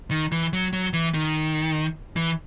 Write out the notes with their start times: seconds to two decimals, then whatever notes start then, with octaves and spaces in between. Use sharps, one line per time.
0.11 D#3
0.32 E3
0.53 F#3
0.73 F#3
0.93 E3
1.14 D#3
2.16 E3